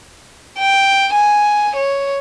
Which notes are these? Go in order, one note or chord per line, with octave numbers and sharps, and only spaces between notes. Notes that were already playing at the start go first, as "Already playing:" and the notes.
G5
G#5
C#5